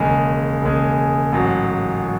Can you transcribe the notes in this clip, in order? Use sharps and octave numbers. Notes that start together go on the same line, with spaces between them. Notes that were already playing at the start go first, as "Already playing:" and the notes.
Already playing: E1 D#2 C#3 G#3
E1 D#2 C#3 G#3
A1 G#2 F#3
F#3